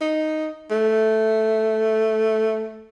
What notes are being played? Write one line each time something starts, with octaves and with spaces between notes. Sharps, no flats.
D#4
A3